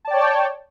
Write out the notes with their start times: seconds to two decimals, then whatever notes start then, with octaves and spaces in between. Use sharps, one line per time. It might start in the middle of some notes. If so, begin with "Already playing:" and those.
0.05 A5
0.07 D5
0.10 G5
0.13 C#5